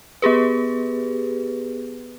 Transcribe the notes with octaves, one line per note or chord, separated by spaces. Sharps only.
B3 G4 G#4 B4